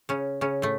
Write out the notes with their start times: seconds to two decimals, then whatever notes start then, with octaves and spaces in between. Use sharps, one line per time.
0.09 C#3 C#4
0.41 C#3 C#4
0.62 A2 A3